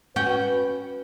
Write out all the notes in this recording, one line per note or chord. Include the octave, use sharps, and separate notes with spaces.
C#4 F#4 B4 G5